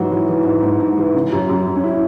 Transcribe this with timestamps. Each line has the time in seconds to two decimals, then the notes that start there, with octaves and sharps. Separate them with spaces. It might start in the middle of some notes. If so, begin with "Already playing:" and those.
Already playing: G#2 E3 F#3 F#4
0.10 E3
0.28 E3
0.45 G#2
0.62 G#2
0.79 G#2
0.97 E3
1.14 C#3
1.32 F#2
1.49 F#2
1.66 F#2
1.76 C#4
1.84 E4